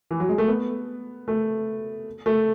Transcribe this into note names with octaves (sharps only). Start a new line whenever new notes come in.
E3
F#3
G#3
A3
B3
A3
A3